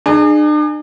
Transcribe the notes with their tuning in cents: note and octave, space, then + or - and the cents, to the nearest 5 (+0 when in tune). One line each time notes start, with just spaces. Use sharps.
D4 +45 G#4 +0